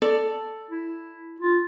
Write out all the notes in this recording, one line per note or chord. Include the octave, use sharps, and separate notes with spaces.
A4 D5
E4
F4